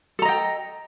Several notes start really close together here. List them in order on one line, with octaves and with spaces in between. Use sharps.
A4 A#5 D#5 G5